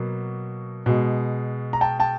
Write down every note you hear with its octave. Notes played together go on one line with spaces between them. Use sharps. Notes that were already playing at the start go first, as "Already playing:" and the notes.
Already playing: B2 F#3 A#3
B2 G#3
A#5
G5 A5
G5 A5